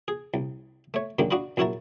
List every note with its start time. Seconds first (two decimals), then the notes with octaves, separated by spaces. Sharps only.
0.08 G#4
0.34 C2
0.94 A3 C#5
1.19 F#2 D3 D#3 G#3 A#3 D4
1.31 D4 F#4 D#5 F5 B5
1.57 A#1 F#2 E4 F#4 A#4 A5